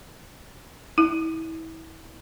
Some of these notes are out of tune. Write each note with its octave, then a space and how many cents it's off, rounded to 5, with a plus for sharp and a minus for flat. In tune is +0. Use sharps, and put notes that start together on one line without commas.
E4 -30